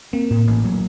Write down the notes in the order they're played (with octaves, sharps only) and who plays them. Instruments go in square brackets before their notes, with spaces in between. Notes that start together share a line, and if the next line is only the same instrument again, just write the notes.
[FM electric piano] A#3 [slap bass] C4
[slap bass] A2
A1
F#3